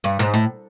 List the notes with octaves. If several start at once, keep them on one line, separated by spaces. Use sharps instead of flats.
G2
G#2
A2